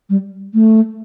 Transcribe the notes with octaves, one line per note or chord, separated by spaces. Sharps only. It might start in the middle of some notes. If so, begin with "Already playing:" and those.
G3
A3